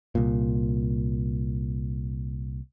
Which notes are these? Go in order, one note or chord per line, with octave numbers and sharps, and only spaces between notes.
C2 A#2